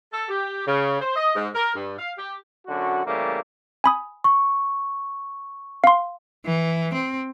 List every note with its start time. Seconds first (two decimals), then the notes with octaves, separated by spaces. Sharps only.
0.12 A4
0.29 G4
0.67 C#3
1.00 C5
1.16 D#5
1.35 G#2
1.55 A#4
1.75 G2
1.97 F5
2.18 G4
2.67 F#2 D3 F#4
3.06 C#3 E3 G3 A3 A#3
3.84 G#5 B5 D#6
4.24 C#6
5.84 F5 C6
6.45 E3
6.94 C4